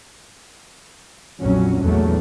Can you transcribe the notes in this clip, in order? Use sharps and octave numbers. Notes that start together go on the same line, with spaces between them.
A#1 F2 F#3 C#4
A#1 E2 F#3 A3